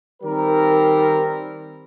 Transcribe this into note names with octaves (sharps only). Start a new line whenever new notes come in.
D#3 G3 C4 A#4